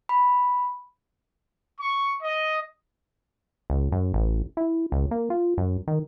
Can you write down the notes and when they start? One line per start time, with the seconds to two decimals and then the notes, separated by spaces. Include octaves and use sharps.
0.09 B5
1.78 C#6
2.22 D#5
3.70 C#2
3.92 F#2
4.14 A1
4.57 E4
4.92 C#2
5.11 A#3
5.30 F4
5.58 F#2
5.88 D#3